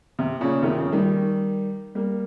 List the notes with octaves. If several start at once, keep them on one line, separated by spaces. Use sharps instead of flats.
C3
A#2 C#3
C3 D#3
C#3 F3
D#3 G3
G3 A#3